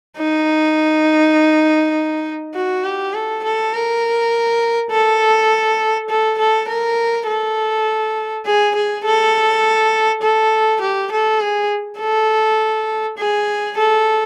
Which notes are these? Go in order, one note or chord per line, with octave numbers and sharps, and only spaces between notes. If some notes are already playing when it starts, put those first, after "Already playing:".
D#4
F#4
G4
A4
A4
A#4
A4
A4
A4
A#4
A4
G#4
G#4
A4
A4
G4
A4
G#4
A4
G#4
A4